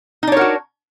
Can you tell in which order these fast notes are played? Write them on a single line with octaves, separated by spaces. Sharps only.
D#4 D4 C#5 A#4 F#4